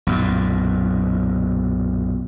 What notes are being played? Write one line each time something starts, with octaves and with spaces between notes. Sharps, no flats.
B1 F#2 A#2